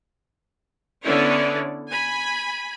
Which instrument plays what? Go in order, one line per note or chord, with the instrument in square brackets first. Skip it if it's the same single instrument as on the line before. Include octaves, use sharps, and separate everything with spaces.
[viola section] D3 B3 C#4 E4 C#5 D5
G#5 B5